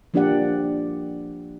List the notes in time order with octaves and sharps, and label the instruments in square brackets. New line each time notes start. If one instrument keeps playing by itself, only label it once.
[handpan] F3 A#3 D4 G4 D5 F#5